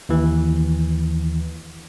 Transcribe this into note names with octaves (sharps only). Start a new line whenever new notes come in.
D#2 E3